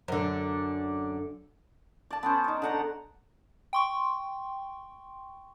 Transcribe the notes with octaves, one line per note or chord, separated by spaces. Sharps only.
F#2 D3
D5 A5
B3 C#4 C5
D#4 D5
D3 F#5 A#5
G5 C6 C#6